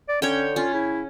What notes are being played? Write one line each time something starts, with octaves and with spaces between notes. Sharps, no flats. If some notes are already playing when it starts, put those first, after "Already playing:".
D5
D3 C#4 C#5 G5
C#4 F4
C#3 E4